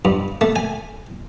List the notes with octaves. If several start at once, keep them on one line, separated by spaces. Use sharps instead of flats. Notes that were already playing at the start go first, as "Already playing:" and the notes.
G2
A3
G#5